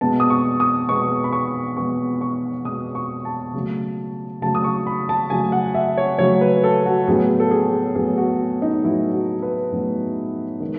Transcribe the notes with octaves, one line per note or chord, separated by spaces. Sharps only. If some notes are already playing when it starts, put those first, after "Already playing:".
B2 G#3 B3 A5
D#6
C#6
D#6
B2 G#3 B3 C#6
B5
C#6
B2 G#3 B3 C#6
C#6
B2 G#3 B3 D#6
C#6
A5
C#3 F#3 A3
C#3 F#3 A3 A5
D#6
C#6
B5
A5
C#3 F#3 A3 G#5
F#5
E5
C#5
C#3 F#3 A3 C#5
B4
A4
F#4
A2 F#3 B3 G#4
A4
G#4
A2 F#3 B3 G#4
F#4
D#4
A2 F#3 B3 E4
F#4
B4
A2 F#3 B3
D#3 G#3